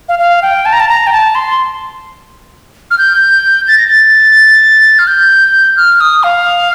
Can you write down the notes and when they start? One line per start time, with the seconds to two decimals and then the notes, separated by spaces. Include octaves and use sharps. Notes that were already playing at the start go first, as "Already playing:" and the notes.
0.09 F5
0.19 F5
0.42 G5
0.65 A5
0.73 A#5
0.80 A5
0.89 A#5
1.07 G5
1.12 A5
1.35 C6
2.91 F6
2.98 G6
3.68 A6
3.77 A#6
3.87 A6
4.99 F6
5.07 G6
5.77 F6
6.00 D#6
6.23 F5